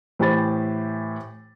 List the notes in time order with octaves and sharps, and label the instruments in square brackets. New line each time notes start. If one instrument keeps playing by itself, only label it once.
[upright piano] A2 E3 G4 C5 B5 A6